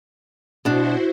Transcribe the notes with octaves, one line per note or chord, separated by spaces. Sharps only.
B2 D4 E4 F#4 C5